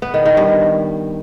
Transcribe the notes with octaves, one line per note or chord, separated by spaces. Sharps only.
B3
D#3
D#3
G2